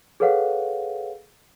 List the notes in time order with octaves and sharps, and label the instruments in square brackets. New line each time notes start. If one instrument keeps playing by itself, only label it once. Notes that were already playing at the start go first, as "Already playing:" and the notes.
[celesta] G#4 A4 B4 C#5 F5 F#5